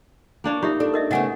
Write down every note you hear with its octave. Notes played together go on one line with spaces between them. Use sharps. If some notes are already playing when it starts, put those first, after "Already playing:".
A#3 D4 C#5
D#4 F4 G4 E5
D4 A4
A#4 D#5 E5
C#3 A3 B3 D#5 F#5 G#5